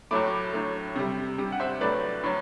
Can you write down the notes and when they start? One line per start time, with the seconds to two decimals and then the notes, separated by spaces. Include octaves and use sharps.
0.11 A2 F#3 A3 B5 D6
0.53 A2 F#3 A3
0.96 C3 G3
1.38 C3 G3
1.52 F#5
1.60 C5 E5
1.81 A2 F#3 A3 B4 D5
2.24 A2 F#3